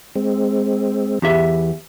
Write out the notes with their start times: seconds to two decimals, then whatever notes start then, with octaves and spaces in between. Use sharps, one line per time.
0.16 G#3 C4
1.22 E2 G4 E5